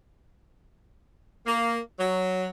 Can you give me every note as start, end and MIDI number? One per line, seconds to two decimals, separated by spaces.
1.46 1.78 58
1.98 2.47 54